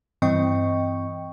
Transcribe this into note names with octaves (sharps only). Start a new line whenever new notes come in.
G2 E3 C4 D#5 G5 C#6